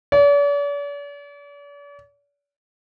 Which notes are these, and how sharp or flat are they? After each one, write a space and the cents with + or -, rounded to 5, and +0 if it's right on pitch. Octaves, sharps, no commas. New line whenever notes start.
D5 -45